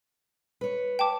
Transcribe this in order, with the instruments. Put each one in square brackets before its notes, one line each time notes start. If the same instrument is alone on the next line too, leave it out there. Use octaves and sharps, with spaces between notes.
[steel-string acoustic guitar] B4 C#5
[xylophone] G5 A5 D6